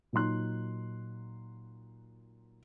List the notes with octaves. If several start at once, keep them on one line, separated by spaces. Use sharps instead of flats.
A#2 F#3 D#4 C6 F#6